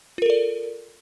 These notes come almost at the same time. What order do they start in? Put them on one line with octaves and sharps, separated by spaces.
F4 A#4 A4 D5